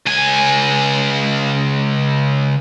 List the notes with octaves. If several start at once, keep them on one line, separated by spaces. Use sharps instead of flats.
C#2 G#5